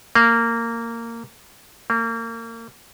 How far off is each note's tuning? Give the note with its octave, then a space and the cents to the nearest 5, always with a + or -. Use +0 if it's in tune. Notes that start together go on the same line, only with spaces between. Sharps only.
A#3 -15
A#3 -30